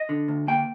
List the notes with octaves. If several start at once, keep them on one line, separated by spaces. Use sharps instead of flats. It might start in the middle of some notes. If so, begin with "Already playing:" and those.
Already playing: D#5
D3
D2
A#3 G5